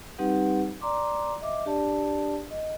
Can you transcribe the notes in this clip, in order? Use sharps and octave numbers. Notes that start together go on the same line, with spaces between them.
G3 C4 D#4 G4 B4 F#5
D5 A#5 C6 D6
D#5 E5 D6
D4 G4 D5 A5
D#5